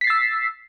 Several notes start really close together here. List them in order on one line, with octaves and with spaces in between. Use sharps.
B6 C7 A6 E6